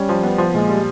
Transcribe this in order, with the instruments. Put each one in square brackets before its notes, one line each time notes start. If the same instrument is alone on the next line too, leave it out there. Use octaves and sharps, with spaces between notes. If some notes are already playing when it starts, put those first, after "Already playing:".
Already playing: [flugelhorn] G3 [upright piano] C#4
[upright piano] F3
B3
F3
[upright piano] A#2 [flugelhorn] G#3
[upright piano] G3